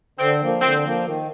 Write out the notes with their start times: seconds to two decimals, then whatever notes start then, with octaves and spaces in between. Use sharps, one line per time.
0.19 D3 C4
0.41 F3 A#3
0.61 D3 C4
0.84 F3 A#3
1.06 D#3